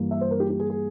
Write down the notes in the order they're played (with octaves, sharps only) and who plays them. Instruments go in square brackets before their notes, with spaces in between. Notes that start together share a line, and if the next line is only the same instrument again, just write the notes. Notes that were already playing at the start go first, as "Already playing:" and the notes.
Already playing: [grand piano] G2 E3 G3 A#3
E5
C5
A#4
G4
G4
G#4
G#4